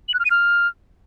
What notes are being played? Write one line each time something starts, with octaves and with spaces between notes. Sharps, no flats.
F#7
F#6
F6
D#7
F6